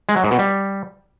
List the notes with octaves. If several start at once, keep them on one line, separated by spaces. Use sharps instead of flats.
G#3
F#3
G#2
B2
G3